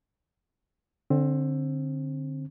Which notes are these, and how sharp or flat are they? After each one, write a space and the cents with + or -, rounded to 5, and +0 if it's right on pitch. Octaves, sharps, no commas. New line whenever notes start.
D3 +0 C4 +20